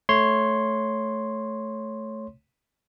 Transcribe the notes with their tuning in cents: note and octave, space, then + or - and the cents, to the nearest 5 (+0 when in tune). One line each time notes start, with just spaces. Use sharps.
A3 -10 C#5 -5 C6 +0